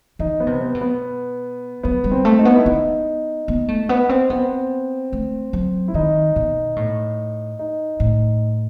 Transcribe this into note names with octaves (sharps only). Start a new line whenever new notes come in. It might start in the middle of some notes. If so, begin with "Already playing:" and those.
E3 D#4
B3
C3
B3
B2
B3
F#3 B3
G3
C4
A3
D#4
B3
E4
B3 D#4
B3
A3
B3
C4
B3 C4
A3
F#3
E4
D#3 D#4
B2
A2
D#4
A2